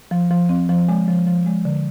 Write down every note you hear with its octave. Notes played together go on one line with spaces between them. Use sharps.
F3
F3
C4
F3
G#3
F3
F3
G#3
D3